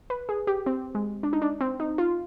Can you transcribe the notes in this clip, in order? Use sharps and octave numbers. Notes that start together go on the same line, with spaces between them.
B4
G#4
G4
C4
G#3
D4
D#4
D4
C4
D#4
F4